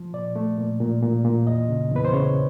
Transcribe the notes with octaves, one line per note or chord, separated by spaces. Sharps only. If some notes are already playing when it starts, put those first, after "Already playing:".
Already playing: F3
A#2 D5
A3
A#2
A#2
A#2
A#2
E2 D#5
C#3
E2 B4
C5
C#3 C#5